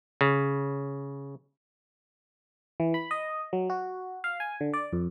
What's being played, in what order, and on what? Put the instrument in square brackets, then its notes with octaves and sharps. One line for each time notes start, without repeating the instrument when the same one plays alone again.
[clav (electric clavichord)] C#3
[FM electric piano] E3
B5
D#5
F#3
F#4
F5
G#5
D3
D5
F2